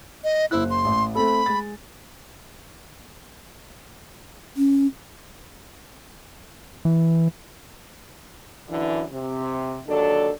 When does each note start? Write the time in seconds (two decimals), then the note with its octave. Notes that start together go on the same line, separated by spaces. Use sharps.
0.24 D#5
0.51 F#1 E4 C5 F#6
0.70 C6
0.84 A1
1.15 A3 C4 A4 B5
1.46 G#3 A6
4.57 C#4
6.85 E3
8.69 F#2 D3 E3
9.12 C3
9.87 D#2 D3 F#3 D4 A4